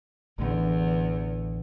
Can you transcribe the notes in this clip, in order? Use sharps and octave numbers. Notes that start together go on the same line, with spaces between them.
A1 E2 D3